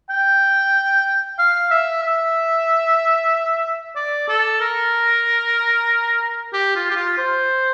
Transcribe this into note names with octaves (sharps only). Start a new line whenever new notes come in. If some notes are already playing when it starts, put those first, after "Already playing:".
G5
F5
E5
E5
D5
A4
A#4
G4
F4
G4
F4
C5